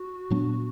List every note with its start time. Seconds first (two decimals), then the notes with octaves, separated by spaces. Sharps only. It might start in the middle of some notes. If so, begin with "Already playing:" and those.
Already playing: F#4
0.30 A#2 F#3 B3 D4